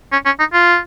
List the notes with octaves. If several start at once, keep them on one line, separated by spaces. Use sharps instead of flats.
C#4
C#4
D#4
F4